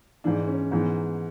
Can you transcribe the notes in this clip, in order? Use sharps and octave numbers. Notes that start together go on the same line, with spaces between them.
G#2 E3 D4
C#4
G#2 E3 B3